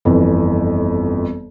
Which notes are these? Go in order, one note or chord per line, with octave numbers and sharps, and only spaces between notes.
G1 F2 E3